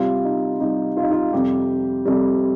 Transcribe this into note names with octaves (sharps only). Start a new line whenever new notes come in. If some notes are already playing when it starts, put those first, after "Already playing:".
Already playing: C3 G3 F4
D#4
C3 G3 D#4
F4
D#4
F4
F2 C3 G3 G4
F2 C3 G3